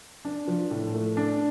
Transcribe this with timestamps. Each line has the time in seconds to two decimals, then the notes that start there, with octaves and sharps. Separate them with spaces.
0.25 D4
0.48 F3
0.71 A2
0.94 A3
1.17 D4